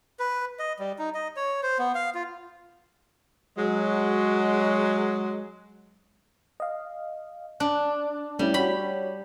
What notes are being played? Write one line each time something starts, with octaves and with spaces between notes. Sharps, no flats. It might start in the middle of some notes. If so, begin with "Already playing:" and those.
B4
D#5
G3
D#4
D#5
C#5
C5
B3
F5
F4
F#3 G#3
D#5 F5
D4 F#6
G3 A3 C#4 E4
F#4 G4 C#5 B5